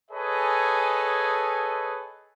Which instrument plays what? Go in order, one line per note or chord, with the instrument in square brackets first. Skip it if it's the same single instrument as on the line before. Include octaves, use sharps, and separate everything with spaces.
[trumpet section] G#4 A4 B4 C#5 D#5 G#5